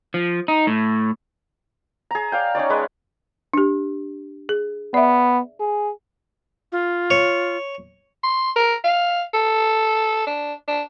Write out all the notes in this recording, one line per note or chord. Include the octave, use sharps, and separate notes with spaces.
F3
D#4
A2
G#4 A#5
D5 F5 G5
C#4 D#4 C#5 D5
G#3 G#4 B4
D4 G4
G#4
B3 D5 E5
G#4
F4
C#5
C6
A#4
F5
A4
D4
D4